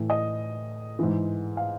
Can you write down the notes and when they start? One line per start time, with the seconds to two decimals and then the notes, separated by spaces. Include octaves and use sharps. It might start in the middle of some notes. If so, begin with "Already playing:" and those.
Already playing: A2 E3
0.10 D#5
0.99 G#2 E3
1.57 F5